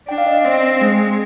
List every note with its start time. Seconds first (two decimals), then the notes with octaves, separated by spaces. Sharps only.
0.08 D4 G5
0.18 F5
0.26 D#5
0.44 C4
0.81 G#3